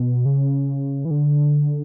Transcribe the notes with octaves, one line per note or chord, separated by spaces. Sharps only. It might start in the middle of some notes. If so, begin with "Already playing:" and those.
Already playing: B2
C#3
E3
D3